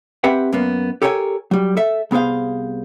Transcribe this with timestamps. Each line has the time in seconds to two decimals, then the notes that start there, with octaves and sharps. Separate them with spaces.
0.24 C4 G4 B4 E5 F#5
0.52 F#2 A#3 B3
1.02 G4 A4 A#4 C#5 F#5 G#5
1.51 F#3 G3
1.77 A4 E5
2.11 C2 B3 G#4 C5 F5